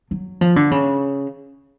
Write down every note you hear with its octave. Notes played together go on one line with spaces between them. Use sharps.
F#3
F3
D3
C#3